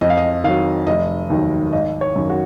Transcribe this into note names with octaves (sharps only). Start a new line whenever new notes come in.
F2 D#5
F5
D#5
D#3 F#3 F5
F1 D#5
D#2 D#3 F#3
G#1 D#5
C#5
F#2 D#3
F#4